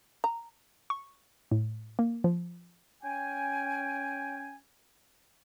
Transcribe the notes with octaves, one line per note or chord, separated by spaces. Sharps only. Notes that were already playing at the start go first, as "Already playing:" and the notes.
A#5
C#6
A2
A#3
F3
C#4 G5 G#5